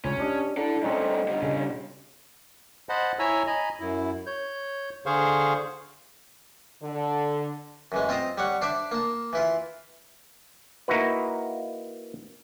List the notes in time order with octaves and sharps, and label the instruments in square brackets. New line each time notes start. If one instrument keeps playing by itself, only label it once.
[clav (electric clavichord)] C#2 [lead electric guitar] C#4
[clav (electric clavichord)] D4 D#5 [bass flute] G4
[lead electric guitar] D4 A4 [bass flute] E4 [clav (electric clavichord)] A#5
[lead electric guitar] G2 A3 [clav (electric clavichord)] C4 C#4 D#4 [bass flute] D#5
[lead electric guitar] D3 G3
[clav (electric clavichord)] C#3
[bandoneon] C5 D#5 F#5 A5 B5
E4 C#5 E5 G#5 A#5 E6
D#5 G#5 A#5 B5
F#2 E4
C#5 G6
D3 G#4 C5 F5 C#6
[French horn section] D3
[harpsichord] F#2 E3 G#3
C4 F4 C5 D#5 A#5
G3 C#5 F#5
D4 C5 D5 E5
A#3 A5
E3 E4 F4
[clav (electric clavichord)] A#3 D#4 E4 F#4 B4